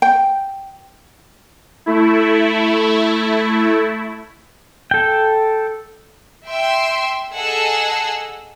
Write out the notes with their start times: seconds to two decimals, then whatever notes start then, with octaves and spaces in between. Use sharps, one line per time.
0.02 G5
1.86 A3 E4
4.91 A4 G5
6.48 E5 G5 C6
7.35 G#4 A4 D#5 F#5 G#5 E6